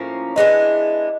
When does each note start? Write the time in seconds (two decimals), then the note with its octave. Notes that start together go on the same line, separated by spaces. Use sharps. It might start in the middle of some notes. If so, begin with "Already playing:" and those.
Already playing: A2 F3 A#3 C#4
0.36 E3 G#3 B3 D4 D#5